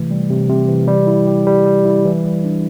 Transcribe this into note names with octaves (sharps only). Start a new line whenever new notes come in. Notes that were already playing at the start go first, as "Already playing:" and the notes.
Already playing: C3 E3 A3
G3
C3
C3
E3
G3
E4
G4
G3
G3
E4
E3
G3
D4